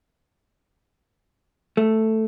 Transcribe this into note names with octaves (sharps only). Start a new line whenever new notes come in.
A3